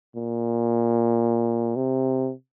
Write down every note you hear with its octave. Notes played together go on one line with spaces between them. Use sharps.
A#2
C3